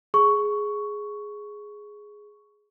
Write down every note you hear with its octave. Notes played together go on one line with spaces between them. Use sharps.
G#4 C#6